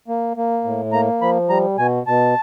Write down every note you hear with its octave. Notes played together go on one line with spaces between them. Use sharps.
A#3
A#3
A2
A#3 A#5
F3 B5
G3 A#5
B2 G#5
B2 A5